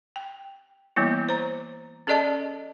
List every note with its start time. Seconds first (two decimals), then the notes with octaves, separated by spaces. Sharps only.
0.16 G5
0.96 E3 G3 A#3 B3 E4
1.29 C5 A#5
2.07 C#4 G#4 A4 D5 D#5 A5